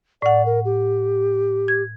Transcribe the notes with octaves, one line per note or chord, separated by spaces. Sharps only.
A2 D5 F#5
A#4
G4
G#6